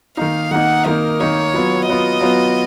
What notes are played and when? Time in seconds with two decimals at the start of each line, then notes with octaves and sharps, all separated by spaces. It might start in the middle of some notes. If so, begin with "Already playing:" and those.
0.17 D#3 A#3 D#4 F5
0.51 D#3 A#3 D#4 F#5
0.86 D#3 A#3 D#4 A#4
1.20 D#3 A#3 D#4 C#5
1.54 F#3 B3 F4
1.87 F#3 B3 F4 D#5
2.21 F#3 B3 F4